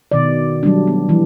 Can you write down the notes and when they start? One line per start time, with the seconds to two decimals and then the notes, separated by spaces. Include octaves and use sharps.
0.12 B2 D#3 D5
0.63 F#3 G3 A3 D4
0.87 B3
1.09 E3 F3 G3